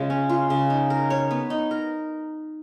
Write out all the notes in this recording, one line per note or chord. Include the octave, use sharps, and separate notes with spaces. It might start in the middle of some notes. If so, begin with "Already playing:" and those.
Already playing: C#3 G#3 F4
C#4
F4
C#3
D#4
A#4
C#5
B3
D#4
A#4